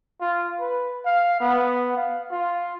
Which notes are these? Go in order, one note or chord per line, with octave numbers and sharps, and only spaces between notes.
F4
B4
F5
B3
F5
F4